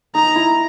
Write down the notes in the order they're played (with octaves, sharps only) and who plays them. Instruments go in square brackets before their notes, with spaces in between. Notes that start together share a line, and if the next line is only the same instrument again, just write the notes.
[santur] D#4 [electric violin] A#5
[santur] E4